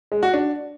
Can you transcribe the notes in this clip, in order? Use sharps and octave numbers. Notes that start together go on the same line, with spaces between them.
G#3
F#4
D4